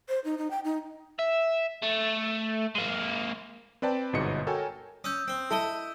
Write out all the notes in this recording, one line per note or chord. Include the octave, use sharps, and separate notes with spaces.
C5
D#4
D#4
G5
D#4
E5
A3
G#3 A#3
C4 B4 D5 G5 A5
G1 G#2 B2 D#5 C#7
F#4 A4 A#4 C#5 G5 G#5
C#4 D#6 E6 G6
C4
E4 A4 D#5